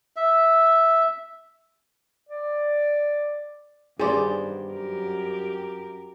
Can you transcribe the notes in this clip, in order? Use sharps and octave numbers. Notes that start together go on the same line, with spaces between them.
E5
D5
G2 D#3 G3 B3 G#4 C5 D5
F#2 G4 A#4